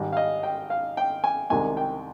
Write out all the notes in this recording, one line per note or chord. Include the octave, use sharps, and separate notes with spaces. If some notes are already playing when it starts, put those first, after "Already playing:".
Already playing: G#1 G#2 G3
F5
D#5
G5
F5
G5
G#5
C2 C3 D#3 G#3 G#5
G5